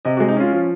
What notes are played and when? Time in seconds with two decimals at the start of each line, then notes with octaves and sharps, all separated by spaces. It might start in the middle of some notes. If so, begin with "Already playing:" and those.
0.05 C3 D#5
0.17 F#4
0.20 G#3
0.28 D#4
0.37 C#4 F4
0.52 F3